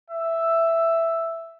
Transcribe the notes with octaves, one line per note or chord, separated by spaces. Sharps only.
E5